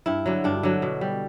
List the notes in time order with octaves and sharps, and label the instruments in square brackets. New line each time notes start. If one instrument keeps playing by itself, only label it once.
[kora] G2 E4
D3 F#3
G2 D4
D3 F#3
B2
G3